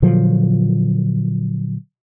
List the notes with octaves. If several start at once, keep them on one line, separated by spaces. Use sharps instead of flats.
A#2 D3 F3 F#3